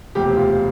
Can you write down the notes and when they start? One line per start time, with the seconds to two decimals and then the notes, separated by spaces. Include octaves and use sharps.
0.15 E1 D2 C3 F3 G4
0.37 F4